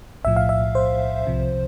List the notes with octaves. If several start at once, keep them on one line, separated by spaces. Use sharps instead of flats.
B1 A2 F3 E5
F5
E5
C5
C2 C3 F3